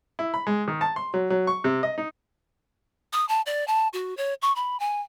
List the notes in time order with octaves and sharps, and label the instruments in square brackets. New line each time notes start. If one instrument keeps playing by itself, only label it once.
[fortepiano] E4
B5
G#3
D#3
A5
C6
F#3
F#3
C#6
C3
D#5
D#4
[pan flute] D#6
A5
D5
A5
F#4
C#5
C#6
B5
G#5